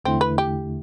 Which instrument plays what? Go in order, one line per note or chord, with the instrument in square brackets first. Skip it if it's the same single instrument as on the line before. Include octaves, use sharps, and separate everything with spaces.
[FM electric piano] E2 D3 A3 E4 [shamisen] C4
[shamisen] B4
G4